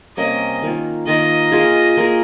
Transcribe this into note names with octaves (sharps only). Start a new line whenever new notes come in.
C3 G3 A#3 C#4 D#5
D#3 A#3 F4
D#3 A#3 F4 D#5
A#3 F4 G#4
A#3 F4 G#4